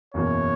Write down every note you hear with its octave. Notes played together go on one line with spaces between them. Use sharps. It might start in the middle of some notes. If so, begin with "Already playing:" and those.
F#1 E2 B2 A#3 C#5